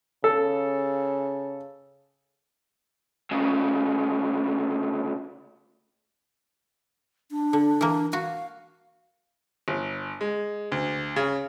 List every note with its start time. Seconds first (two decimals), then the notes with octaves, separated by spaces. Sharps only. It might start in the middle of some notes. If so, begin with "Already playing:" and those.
0.24 C#3 A4
3.31 D2 C#3
7.31 D4
7.53 D3
7.81 E3 A#3
8.13 F#4 F5
9.68 G1
10.21 G#3
10.72 D2
11.16 C#3